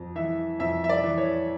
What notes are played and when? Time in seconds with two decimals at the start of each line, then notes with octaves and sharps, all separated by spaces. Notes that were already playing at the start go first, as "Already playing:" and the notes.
Already playing: F2
0.15 E3 E5
0.59 F2 E5
0.84 E5
0.89 D5
1.04 E3
1.18 C#5